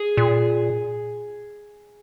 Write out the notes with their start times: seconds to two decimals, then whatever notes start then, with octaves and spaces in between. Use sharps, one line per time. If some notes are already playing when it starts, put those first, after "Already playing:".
Already playing: G#4
0.17 A#2